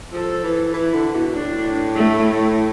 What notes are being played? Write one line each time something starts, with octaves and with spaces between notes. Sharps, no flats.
F3 A4
E3
E3 E4
D3
B2
A2 D4
A3